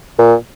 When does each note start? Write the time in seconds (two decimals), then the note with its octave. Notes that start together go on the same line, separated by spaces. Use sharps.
0.19 A#2